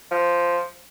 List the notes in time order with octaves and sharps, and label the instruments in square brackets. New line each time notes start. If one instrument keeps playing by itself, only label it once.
[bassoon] F3